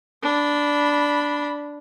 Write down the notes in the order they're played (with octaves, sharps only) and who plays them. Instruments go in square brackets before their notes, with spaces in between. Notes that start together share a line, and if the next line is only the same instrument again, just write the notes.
[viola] D4 B5